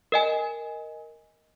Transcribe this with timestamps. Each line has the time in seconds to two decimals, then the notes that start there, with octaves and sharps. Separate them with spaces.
0.12 A#4 D#5 G#5